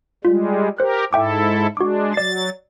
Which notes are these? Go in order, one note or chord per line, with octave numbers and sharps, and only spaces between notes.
G3 G#3 F4
G4 A#4 C5 F#6
G#2 E4 A4 E5 G5 D6
G#3 D4 F#4 D6
F#3 D5 A6 C7